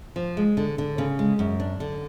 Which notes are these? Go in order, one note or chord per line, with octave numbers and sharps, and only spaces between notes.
F3
G#3
D3
D3
C#3
G#3
F#2
D4
D3